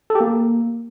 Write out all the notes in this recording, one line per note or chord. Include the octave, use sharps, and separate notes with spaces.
A4
G4
A#3